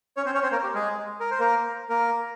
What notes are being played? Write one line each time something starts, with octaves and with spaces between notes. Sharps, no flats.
C#4 C#5
C4 C5
C#4 C#5
C4 C5
A#3 A#4
G4
G#3 G#4
A#4
C5
A#3 A#4
A#3 A#4